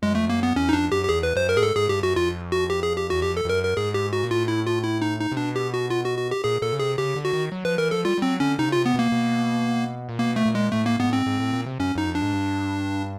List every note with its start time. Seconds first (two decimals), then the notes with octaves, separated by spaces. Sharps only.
0.02 F#2 G#3
0.15 F2 A3
0.28 F#2 A#3
0.43 B3
0.56 E2 C#4
0.69 D#4
0.73 F2 D4
0.92 F#2 G4
1.05 G4
1.09 E2 G#4
1.23 B4
1.36 F#2 C5
1.49 A#4
1.56 A2 G#4
1.63 G#2 A4
1.76 G#2 G#4
1.89 G2 G4
2.03 F#2 F#4
2.16 F2 F4
2.52 F#4
2.70 G4
2.83 G#4
2.97 G4
3.10 E2 F#4
3.23 F2 G4
3.37 A4
3.45 F2
3.49 F#2 A#4
3.64 A#4
3.77 G#2 G#4
3.94 G4
4.13 F#4
4.23 A#2
4.31 A2 F4
4.48 E4
4.66 F4
4.84 E4
5.02 D#4
5.20 D#4
5.32 C3
5.37 B2 D4
5.56 G4
5.74 F#4
5.90 F4
6.05 F#4
6.18 F#4
6.31 G4
6.44 A#2 G#4
6.62 A#2 A4
6.73 C#3
6.80 C3 G#4
6.98 C#3 G4
7.16 D3
7.25 F#4
7.33 D#3
7.52 F#3
7.65 F3 B4
7.78 E3 A#4
7.91 F3 A4
8.05 G3 F4
8.18 G3
8.22 F#3 C4
8.40 D3 C#4
8.59 C3 D#4
8.68 C#3
8.72 C3 F4
8.86 B3
8.94 B2 A#3
9.12 B2
10.09 A#2
10.19 B2 A#3
10.36 A3
10.46 A#2
10.55 G#3
10.73 A2 A3
10.86 A#3
10.99 G#2 B3
11.08 A2
11.13 G#2 C4
11.26 G#2
11.39 A2
11.53 A#2
11.66 C3
11.80 F#2 C#4
11.95 F#2 D#4
12.07 F2
12.15 D4
12.22 G#2
12.34 G2